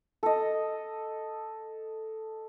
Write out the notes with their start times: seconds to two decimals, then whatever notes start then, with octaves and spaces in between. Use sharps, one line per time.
0.23 A4 D#5